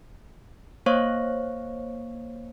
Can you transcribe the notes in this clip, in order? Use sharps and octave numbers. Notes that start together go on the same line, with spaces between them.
A#3 C5 C#5 F5 C#6